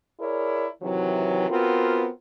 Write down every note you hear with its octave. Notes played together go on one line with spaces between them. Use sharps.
E4 G#4 A#4 C#5 D5
C3 D#3 E3 F#3
B3 C4 F4 F#4 A#4